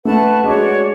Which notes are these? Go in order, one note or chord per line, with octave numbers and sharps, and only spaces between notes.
A3 B4 F#5 A5 C#6
G#3 D4 F#4 C#5